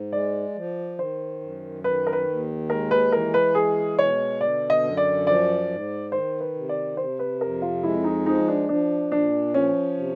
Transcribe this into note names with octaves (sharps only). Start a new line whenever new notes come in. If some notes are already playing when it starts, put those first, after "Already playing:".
Already playing: G#2
G#3 D5
F3
D#3 C5
F#2
D#3 B4
A#4
B4
D#2
G#3 A#4
B4
E3 A#4
B4
G#3 G#4
B2 C#5
D3 D5
D#5
F#2
D5
F3 D5
G#2
D#3 C5
B4
C3
D5
C3 C5
B4
F2 A#4
F4
G#3 E4
D#4
F3 D#4
D4
F3 D4
A#2 D4
F3 C#4
C3